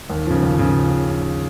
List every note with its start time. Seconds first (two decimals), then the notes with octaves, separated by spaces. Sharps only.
0.10 D#2
0.26 C#3 F3
0.43 D#2
0.59 C#3 F3